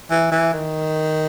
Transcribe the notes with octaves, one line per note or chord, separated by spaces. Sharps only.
E3
E3
D#3